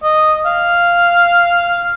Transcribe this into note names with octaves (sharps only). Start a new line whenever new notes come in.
D#5
F5